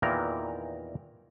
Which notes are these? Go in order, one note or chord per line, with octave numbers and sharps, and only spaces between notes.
E2 A#2 D#3 E3 A#4 A#5